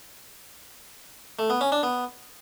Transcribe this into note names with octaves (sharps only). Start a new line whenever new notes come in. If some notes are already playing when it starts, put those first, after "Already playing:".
A3
B3
C#4
D4
B3